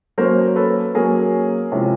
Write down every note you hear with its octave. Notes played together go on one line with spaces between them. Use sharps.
F#3 A#3 C#4 A#4 C5
A4 B4
F#3 A#3 C#4 G#4 A#4
C3 F3 G#3 C#4 E4